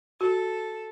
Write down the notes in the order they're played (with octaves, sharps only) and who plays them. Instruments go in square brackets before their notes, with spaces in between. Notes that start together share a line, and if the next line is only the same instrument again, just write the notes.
[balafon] F#4 [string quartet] A4